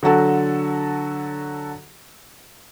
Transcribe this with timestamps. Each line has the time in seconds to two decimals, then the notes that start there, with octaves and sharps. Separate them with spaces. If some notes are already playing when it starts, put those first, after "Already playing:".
0.03 D3 F#3 F#4 A4